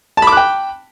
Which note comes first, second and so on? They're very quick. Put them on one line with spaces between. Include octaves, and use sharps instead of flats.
A5 B5 D6 F#6 G5